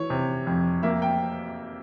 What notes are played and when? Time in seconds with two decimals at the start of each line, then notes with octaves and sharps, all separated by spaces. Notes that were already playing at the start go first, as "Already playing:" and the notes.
Already playing: E3 C#5
0.10 C3
0.47 F2
0.83 A#3 E5
1.02 G5